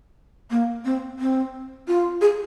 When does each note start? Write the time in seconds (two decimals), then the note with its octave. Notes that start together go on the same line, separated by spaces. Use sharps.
0.51 A#3
0.85 C4
1.19 C4
1.88 F4
2.21 G#4